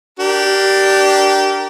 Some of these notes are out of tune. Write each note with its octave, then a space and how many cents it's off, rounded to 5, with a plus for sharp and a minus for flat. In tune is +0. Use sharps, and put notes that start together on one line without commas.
D4 +5 G4 -20 A#4 +0